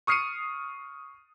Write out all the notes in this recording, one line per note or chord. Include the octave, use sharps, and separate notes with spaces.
C#6 D#6 F6 C7 C#7 D#7